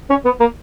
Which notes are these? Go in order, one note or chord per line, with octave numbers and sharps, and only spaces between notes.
C#4
B3
A#3